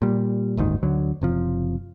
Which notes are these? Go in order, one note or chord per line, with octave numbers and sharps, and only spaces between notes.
A#2 G3
F#1 D2 G#2 D#3
D2 D3 F#3
F#1 C3 F3